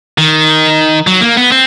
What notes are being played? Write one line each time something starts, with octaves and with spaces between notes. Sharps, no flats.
D#3
F#3
A#3
B3
C4